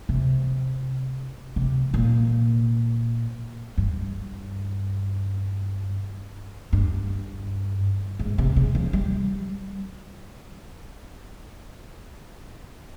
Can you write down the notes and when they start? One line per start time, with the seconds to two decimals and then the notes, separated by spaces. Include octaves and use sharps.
0.09 C3
1.56 C3
1.94 A#2
3.78 G2
6.73 G2
8.19 G#2
8.38 C3
8.56 C#3
8.75 F3
8.93 G3